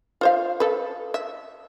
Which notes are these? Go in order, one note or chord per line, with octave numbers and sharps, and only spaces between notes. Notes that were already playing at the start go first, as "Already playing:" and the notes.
F4 C5 F5
A4 B4
E5